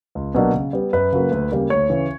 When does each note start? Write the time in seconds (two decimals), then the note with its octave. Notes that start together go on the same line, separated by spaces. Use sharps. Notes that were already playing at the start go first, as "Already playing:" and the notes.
0.15 C#2
0.35 B2 F#3 A#3 D4
0.54 C#3
0.73 G3 B3
0.93 F#2 B4
1.13 C#3 F#3 A#3
1.32 D2
1.51 C#3 G3 A#3
1.70 D2 C#5
1.90 C#3 E3